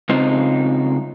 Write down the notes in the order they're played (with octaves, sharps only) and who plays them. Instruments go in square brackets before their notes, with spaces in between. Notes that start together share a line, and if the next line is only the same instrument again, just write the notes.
[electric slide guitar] C#3 G#3 C4 D#4 F4 C5